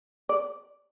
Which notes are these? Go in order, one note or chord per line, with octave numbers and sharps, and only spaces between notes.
D5